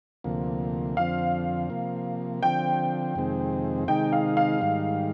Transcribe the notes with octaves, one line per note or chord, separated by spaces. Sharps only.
D2 C3 F3 A#3
F2 D3 F3 C4 F5
C3 F3 A#3
D3 F3 C4 G5
F2 C3 D#3 G#3 C4
C3 D#3 G#3 D#4 G5
F5
F5
G#2 D#3 G3